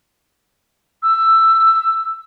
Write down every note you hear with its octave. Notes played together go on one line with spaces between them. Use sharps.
E6